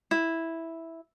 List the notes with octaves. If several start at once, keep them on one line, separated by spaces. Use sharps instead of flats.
E4